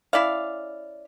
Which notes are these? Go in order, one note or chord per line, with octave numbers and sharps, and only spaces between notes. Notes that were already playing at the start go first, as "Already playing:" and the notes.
C#4 E4 D5 F5